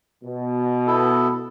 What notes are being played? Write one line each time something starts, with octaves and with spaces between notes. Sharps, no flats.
B2
B3 E4 A4